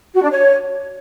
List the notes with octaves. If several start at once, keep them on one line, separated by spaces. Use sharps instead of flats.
F#4
D4
C#5